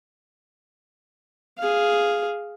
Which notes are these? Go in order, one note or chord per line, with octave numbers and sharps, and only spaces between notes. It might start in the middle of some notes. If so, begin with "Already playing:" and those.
G#4 F5